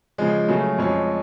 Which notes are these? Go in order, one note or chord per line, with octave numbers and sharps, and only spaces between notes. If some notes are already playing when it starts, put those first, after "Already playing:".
C#3 F3 G#3
C#3 F#3 A3
F2 F3 G#3 C#4